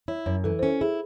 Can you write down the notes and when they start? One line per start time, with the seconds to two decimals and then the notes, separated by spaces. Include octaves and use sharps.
0.08 E4 C#5
0.26 F#2 C#5
0.44 E3 A4
0.59 C5
0.63 C#4 A4
0.81 E4 G#4